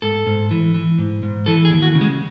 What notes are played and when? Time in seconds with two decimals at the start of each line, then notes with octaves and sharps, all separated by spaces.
0.02 G#2 A4
0.27 G#2
0.51 E3
0.74 E3
0.98 G#2
1.23 G#2
1.46 E3 A4
1.65 G#4
1.71 D#2
1.82 F#4
1.95 C#3
2.01 G#3